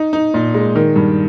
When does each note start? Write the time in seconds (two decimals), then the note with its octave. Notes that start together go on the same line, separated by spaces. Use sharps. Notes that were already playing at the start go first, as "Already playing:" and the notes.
Already playing: D#4
0.13 D#4
0.34 A#2
0.54 G#3
0.75 D#3
0.96 G2